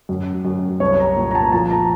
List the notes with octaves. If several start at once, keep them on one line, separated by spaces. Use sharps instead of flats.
F#2
F#2
C2 C#5
A#5
A#2
A#5
A5
F3 A5
A#5